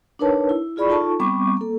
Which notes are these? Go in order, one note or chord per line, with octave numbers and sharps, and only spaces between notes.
D4 D#4 A#4 B4 C#5 A5
E4
E4 F4 G#4 D5 B5 C#6
D#4 F4 A4 A5 C#6
G3 B3 C4 C#6 D6
A#3 A4